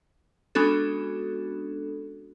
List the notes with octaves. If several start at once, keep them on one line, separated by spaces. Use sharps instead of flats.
G#3 B3 C#4 D4 F#4 A4